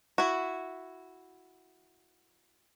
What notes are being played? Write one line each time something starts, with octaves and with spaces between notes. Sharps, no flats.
E4 F#4